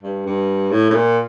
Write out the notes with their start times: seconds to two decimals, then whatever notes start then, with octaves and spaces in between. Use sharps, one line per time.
0.03 G2
0.26 G2
0.72 A2
0.90 A2
0.94 A#2